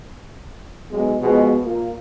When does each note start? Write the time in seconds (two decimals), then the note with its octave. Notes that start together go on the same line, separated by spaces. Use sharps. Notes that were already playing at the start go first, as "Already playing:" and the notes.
0.91 B1 G#3
1.21 B2 F3 G#3
1.64 A#2 A#3